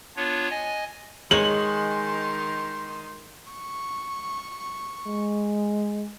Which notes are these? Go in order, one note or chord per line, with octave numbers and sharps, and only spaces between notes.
B3 D4 F4 C#5
D#5 G#5
D#3 G#3 C#5 C6 F#7
C#6
G#3